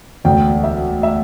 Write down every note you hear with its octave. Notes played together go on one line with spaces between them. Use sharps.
E1 D2 D3 G5
E5
E5